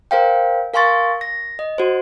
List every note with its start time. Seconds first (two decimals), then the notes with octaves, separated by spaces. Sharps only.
0.11 A#4 C5 F5 G5
0.74 A#4 F5 G#5 C6 C#6 A6
1.21 A#6
1.59 D#5
1.78 F#4 C5